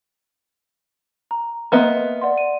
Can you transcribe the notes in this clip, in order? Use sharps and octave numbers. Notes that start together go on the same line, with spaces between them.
A#5
A#3 B3 D#5 E5 C6
D5 F#5 C6
D#7